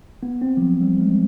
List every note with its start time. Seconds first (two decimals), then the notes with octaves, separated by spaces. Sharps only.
0.23 B3
0.42 C4
0.57 F3
0.62 F#3
0.82 G3
1.01 G#3